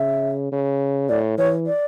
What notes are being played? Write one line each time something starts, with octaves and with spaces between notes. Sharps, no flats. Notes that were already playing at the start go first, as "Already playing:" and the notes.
Already playing: C#3 E5
C#3
A2 D5
E3 C#5
D5